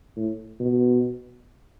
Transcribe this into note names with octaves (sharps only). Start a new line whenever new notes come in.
A2
B2